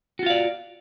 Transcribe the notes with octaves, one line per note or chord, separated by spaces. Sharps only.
F4 F#4 D5 F5